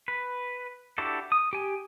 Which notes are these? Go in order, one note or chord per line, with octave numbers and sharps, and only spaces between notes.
B4
D4 E4 F#4 G4 A4
D#6
G4 G#5